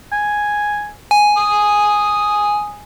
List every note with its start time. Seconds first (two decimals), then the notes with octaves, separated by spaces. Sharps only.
0.12 G#5
1.11 G#5
1.37 D#6